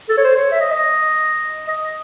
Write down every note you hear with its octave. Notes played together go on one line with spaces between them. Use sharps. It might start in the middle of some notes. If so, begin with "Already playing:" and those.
A4
C#5
C5
C#5
E5
D#5
D#5
D#5